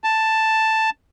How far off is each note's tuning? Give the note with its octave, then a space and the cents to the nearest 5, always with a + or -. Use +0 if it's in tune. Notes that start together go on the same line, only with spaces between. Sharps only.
A5 +5